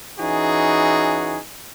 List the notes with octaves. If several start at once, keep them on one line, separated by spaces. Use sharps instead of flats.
E3 C#4 D#4 F#4 G#4